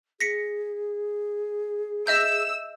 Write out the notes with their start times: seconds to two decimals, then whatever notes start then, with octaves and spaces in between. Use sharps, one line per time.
0.20 G#4 A#6 B6 C#7
2.07 D#5 E5 E6 G6